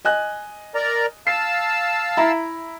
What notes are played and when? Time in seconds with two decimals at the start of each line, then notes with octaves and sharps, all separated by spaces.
0.05 D#5 G#5 F#6
0.75 A#4 D5 A#5
1.27 F5 A5 E6 C7
2.17 E4 E5 A#5